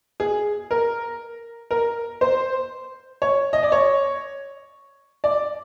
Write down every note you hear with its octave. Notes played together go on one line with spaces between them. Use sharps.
G#4
A#4
A#4
C5
C#5
D#5
D5
C#5
D5